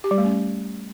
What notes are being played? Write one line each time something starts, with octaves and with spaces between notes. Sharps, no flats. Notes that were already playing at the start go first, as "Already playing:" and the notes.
G4
G3
A3
C#4